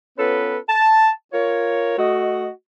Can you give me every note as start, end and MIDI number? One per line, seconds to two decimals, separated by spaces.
0.18 0.57 59
0.18 0.57 61
0.18 0.57 65
0.18 0.57 69
0.18 0.57 71
0.68 1.10 81
1.33 1.95 65
1.33 1.95 70
1.33 1.95 73
1.98 2.48 57
1.98 2.48 66
1.98 2.48 75